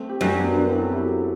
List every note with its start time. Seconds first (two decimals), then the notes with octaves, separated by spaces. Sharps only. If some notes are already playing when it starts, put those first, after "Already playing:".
Already playing: A3 C4
0.09 G4
0.21 F#2 D4 F#4
0.39 B3 D4
0.56 B3 D4
0.69 C4 E4
0.80 F#4 A4
0.92 E4 G4